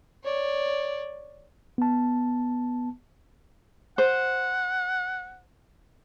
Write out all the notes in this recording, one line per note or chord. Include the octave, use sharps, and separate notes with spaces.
C#5 D5
B3 A5
C5 F#5